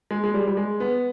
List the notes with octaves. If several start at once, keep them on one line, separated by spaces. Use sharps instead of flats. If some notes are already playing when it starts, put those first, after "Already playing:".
G#3
G#3
G3
G3
G#3
B3